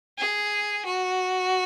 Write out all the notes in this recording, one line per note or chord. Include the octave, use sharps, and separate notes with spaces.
G#4
F#4